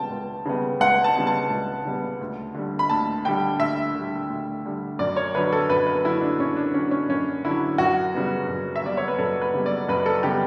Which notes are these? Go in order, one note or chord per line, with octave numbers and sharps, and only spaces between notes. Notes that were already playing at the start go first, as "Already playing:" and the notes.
Already playing: C#2 C#3 G3 B3 G5 A5
C#2
C#3 G3 B3
C#2 F#5
A5
C#3 G3 B3
A5
C#2
C#3 G3 B3
D2
D3 G3
B5
D2 A5
D3 G3 G5
D2 E5
D3 G3
D2
D3 G3
F#2 D5
C#5
D3 F#3 B4
A4
F#2 B4
B4
D3 F#3 E4
D4
F#2 C#4
D4
D3 F#3 C#4
C#4
F#2 C#4
D3 F#3 E4
F#2 F#4
C#3 G3 B3
F#2
E5
C#3 G3 B3 D5
C#5
B4
F#2 A4
B4
C#3 G3 B3
D5
F#2 B4
A4
C#3 G3 B3 G4